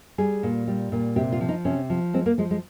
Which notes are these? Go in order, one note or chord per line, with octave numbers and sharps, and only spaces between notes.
G3 G#4
A#2
G3
A#2
C3 G4
F4
F3
D#4
C3 C#4
F3
G#3 C4
A#3
F3 G#3
G#3